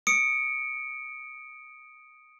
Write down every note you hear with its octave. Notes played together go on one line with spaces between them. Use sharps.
D#6 C#7 D7